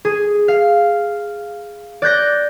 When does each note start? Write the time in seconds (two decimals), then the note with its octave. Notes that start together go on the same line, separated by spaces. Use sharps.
0.05 G#4
0.48 F5
2.02 D5 F#6 G6 A#6